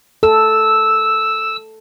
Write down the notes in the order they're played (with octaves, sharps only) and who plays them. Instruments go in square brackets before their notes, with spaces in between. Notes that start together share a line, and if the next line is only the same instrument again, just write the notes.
[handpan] A4 [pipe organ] E6